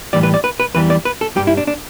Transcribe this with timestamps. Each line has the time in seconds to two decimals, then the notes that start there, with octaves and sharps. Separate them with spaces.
0.13 A2 E3 G3 D5
0.23 B4
0.34 D5
0.44 B4
0.60 B4
0.74 E2 E3 G3 B4
0.90 D5
1.05 B4
1.21 A4
1.36 G2 G3 G4
1.47 E4
1.57 D4
1.67 D4